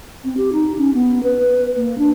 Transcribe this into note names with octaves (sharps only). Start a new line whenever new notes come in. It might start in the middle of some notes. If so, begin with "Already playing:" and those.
C4
G4
D#4
C#4
B3
B4
A#3
D4